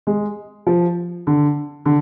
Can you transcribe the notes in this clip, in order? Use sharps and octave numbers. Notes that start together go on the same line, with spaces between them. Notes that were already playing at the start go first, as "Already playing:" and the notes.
G#3
F3
D3
D3